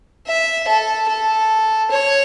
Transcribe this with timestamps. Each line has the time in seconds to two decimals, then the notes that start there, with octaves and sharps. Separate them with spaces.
0.27 E5
0.68 A4
1.08 A4
1.91 C#5